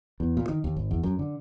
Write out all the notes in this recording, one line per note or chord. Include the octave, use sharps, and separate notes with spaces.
E2
A#2
D#3
D#2
G#1
E2
F#2
D3